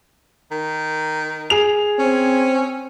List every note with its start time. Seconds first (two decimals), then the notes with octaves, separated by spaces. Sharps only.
0.51 D#3
1.50 G#4 F7
1.99 C4 C#4